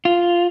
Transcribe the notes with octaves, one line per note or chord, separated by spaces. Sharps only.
F4